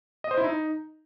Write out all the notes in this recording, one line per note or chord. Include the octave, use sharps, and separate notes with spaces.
D#5
C5
E4
D#4